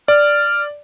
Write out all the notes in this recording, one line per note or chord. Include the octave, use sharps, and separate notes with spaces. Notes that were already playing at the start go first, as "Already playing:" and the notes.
D5 F6